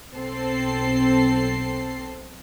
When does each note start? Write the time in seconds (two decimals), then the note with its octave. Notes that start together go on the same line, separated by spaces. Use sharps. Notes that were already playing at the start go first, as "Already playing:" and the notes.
0.12 B1 C4 A4 C7